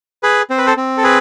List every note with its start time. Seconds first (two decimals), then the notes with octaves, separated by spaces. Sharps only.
0.23 G#4 B4
0.50 C4 C5
0.58 B4
0.66 A4 C5
0.77 C4
0.97 A4
1.03 G#4 B4